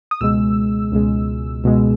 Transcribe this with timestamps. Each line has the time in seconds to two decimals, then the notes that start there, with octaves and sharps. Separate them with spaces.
0.11 D#6
0.21 C#2 B2 G#3 E6
0.92 C#2 B2 G#3
1.64 C#2 B2 G#3